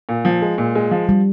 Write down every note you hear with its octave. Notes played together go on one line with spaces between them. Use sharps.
A#2
F3
G#3
A#2
G#3
F3
G3